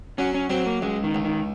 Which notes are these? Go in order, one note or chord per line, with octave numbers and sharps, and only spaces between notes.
F#3 C#4
C#4
F#3 C4
A#3
C#2 G#3
D#3
C#2
D#3